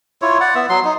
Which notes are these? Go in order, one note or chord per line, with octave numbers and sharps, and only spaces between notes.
E4 F4 C#5
D5 F#5
B3 E5
F#3 C6
D#4